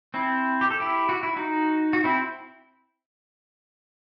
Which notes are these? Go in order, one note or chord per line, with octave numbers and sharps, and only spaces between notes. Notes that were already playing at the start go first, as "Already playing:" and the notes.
C4 E4
G4
A4
E4 G4
F#4
E4
D#4 F#4
F#4
C4 E4